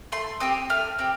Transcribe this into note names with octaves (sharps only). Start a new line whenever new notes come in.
A3 C6
C4 G4 D#6
A3 F6
C4 G4